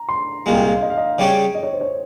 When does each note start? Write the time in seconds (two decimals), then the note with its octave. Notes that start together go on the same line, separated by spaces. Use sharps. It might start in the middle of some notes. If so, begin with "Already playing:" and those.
Already playing: A#5
0.09 C6
0.46 C2 A#2 G#3 F5
0.54 G5
0.64 F5
0.82 D#5
0.90 F5
0.97 D#5
1.18 C#3 G3 C#4 G4 C#5
1.55 D#5
1.63 C#5
1.73 C5
1.81 C#5